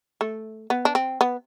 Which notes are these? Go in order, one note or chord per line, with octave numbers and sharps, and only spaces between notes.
A3
B3
D4
C4
B3